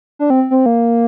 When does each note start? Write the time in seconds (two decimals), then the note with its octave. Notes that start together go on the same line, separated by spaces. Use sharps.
0.19 D4
0.30 C4
0.51 C4
0.66 A#3